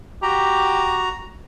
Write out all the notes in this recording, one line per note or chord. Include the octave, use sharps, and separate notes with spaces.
F#4 G4 A#5